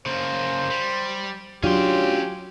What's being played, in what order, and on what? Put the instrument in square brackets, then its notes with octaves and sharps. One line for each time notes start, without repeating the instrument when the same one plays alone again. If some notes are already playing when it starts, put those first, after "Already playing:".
[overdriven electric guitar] C#3 A#3 [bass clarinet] C5
[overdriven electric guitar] G3
[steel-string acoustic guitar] F#3 D4 F4 [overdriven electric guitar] C#4 C6 [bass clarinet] G4